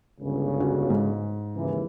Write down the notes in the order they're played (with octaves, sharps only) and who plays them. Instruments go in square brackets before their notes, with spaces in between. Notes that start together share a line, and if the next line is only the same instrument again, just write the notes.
[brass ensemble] G1 C#2 C#3
[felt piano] C#4 F#4
G#2
[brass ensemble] D#2 C#3 E3